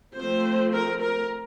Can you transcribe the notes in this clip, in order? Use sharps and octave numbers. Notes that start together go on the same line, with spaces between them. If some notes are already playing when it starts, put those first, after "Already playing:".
F3 A3 C4 C5
A#4
A#4